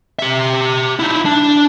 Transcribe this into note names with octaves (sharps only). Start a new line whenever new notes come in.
G4 E5
D#4 E4
D4